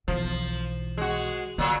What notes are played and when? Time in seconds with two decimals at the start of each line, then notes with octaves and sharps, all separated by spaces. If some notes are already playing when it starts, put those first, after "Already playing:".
0.08 B1 E3 F3
0.98 G#3 F#4
1.58 A#2 D3 F#3